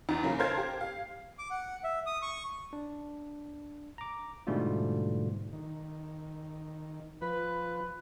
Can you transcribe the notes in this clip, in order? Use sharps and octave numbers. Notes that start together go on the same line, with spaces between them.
E2
C#3 F#3 A#3
A4 A#4 C5 F5 F6 G#6
G4
F5
D6
F#5
E5
D#6
C#6
D4
A#5 D6
G#2 B2 D3 G3 A3 F4
D#3
F3 B4